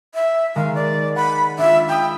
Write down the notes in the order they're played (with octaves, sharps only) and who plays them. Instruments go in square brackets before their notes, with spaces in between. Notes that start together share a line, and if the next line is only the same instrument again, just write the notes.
[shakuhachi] E5
[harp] D#3 G#3 [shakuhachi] F5
[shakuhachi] D5
[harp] F#5 [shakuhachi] B5
[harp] D4 F4 [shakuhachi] E5
[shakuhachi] G5 [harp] B5 D#6